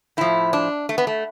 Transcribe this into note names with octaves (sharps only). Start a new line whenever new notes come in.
A2 F3 E4
D4
A3
B3
A3